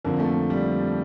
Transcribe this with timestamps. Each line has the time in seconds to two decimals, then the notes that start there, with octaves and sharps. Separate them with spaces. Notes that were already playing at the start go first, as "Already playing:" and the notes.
0.04 F2 D3 F3 A#3
0.20 A3
0.50 G3